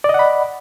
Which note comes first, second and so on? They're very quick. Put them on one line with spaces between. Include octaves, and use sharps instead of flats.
D5 D#5 F#5 B5